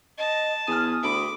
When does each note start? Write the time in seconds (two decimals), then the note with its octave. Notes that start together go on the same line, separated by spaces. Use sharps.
0.18 D#5 A5
0.67 E2 G#5 D#6 F6
1.03 D2 E5 G5 B5 D6